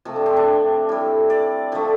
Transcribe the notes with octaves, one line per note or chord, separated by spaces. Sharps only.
C3 F3 A3
D4
C4
D4
A2 G3
D5
D3 F3 A3